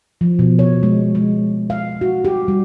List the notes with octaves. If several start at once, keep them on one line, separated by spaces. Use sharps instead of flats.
F3
B2
C#5
G#3
G#3
F5
F#4
G4
G3